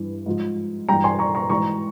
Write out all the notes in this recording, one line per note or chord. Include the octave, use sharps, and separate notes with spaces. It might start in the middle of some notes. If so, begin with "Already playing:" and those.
Already playing: G2 E3
G#2 F3
G2 E3 G5 A#5
G#5 C6
A#5 C#6
A#5 C#6
G#2 E3 A#5 C#6